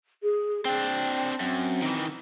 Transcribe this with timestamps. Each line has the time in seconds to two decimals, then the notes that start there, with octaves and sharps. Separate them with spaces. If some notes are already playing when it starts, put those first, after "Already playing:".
0.23 G#4
0.65 C4 D4 G5
1.40 F#2 C4
1.82 D#3 E3